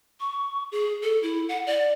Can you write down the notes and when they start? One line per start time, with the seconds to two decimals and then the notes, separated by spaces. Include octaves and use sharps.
0.20 C#6
0.72 G#4
1.03 A4
1.23 E4
1.49 F#5
1.67 D5